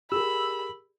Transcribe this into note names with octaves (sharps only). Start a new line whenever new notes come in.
G4 G#4 A#4 B5 E6